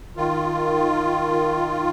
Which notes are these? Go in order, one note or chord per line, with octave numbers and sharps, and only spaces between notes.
D#3 F4